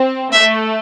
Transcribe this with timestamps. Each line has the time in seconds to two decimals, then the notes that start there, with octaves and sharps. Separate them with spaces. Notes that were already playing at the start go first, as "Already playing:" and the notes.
Already playing: C4
0.33 A3 E5